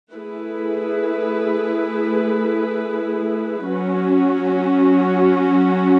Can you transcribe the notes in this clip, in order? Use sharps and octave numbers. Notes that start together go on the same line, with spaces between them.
A3 E4 G#4 B4
F#3 C#4 F#4